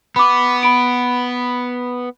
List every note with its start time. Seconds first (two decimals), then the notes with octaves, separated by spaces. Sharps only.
0.16 B3 B5 D6
0.63 B5 D7